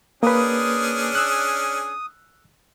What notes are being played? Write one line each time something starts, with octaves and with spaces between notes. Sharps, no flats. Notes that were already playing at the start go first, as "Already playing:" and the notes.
A#3 C#4 D4 G#4 B4 D#6
E6 F#6